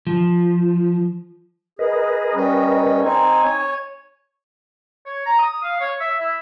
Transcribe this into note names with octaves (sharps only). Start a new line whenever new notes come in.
F3
G#4 A#4 B4 D#5
G3 C#4
C4 D#4 G#5
C#5
C#5
A#5
D#6
F5
C#5
E5
E4